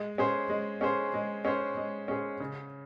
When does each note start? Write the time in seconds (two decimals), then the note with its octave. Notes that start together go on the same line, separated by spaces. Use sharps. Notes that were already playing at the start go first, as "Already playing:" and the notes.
Already playing: G#3
0.18 C#4 G#4 C5
0.49 G#3
0.81 C#4 G#4 C5
1.14 G#3
1.45 C#4 G#4 C5
1.77 G#3
2.08 C#4 G#4 C5
2.40 C#3